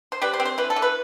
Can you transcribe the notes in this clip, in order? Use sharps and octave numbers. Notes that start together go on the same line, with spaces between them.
C5
G3 B4
C5
C4
C5
E3 B4
A4
E3
B4